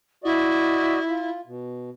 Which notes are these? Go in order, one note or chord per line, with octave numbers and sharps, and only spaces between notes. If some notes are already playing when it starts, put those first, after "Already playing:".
E4 F#4 D5 D#5
F4
B2